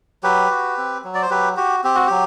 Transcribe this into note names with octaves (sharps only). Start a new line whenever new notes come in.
F#3 G4 B4
F#4
C4
F#3
D5
C5
F#3 G4 B4
F#4 G4
C4 G4
F#4
F#3 G4